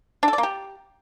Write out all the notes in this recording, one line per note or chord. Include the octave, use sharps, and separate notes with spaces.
D4
A4
D5
A#3
G4